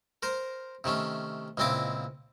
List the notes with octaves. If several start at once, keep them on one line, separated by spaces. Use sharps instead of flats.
A#4 C5
C3 D#3 A3 C#4
C#2 A#2 C4 E4 D#5 D6